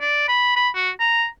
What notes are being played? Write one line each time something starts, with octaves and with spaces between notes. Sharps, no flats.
D5
B5
B5
F#4
A#5